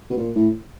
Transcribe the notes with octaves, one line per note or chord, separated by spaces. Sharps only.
B2
A#2
A2